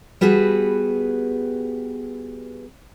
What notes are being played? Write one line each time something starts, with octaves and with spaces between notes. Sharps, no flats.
G3 B3 F#4 G#4 B4